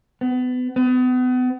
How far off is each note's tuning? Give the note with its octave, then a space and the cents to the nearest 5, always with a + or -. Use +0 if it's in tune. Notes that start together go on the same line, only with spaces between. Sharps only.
B3 +30
B3 +35